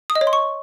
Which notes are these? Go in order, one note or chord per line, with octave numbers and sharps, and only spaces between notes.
D#6
D#5
C#5
C6
C#6